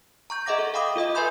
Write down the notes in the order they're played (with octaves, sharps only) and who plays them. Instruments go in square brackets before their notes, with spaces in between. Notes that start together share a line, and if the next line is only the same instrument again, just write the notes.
[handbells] A#5 C#6 G6
G#4 D#5 E5 F#5 D6 A#6
A4
F5 G5 B5 D6 D#6
F4 A4 D#5 D#6
B4 E5 G#5 B5 C6 G6